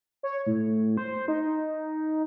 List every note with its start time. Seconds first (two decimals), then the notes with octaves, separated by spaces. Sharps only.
0.23 C#5
0.46 A2
0.98 C5
1.28 D#4